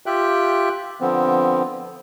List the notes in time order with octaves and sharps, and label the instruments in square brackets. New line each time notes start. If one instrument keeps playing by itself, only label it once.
[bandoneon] F4 G4 E5 G5 F#6
D3 F3 B3 C4